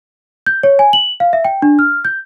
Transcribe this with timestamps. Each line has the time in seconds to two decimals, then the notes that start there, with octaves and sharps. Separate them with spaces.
0.46 G6
0.63 C#5
0.79 G#5
0.93 F#7
1.20 F5
1.33 E5
1.45 G5
1.62 D4
1.79 F6
2.05 G6